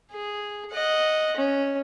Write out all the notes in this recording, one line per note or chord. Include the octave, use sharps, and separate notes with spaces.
G#4
D#5 F#5
C#4